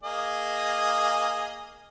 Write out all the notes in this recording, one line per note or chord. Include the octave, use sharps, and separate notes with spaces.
A#3 G#4 D#5